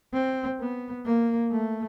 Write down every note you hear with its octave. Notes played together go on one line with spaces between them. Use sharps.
C4
B3
A#3
A3